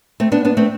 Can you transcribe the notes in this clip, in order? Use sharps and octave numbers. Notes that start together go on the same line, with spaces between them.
A3 C4
B3 D4
B3 D4
A3 C4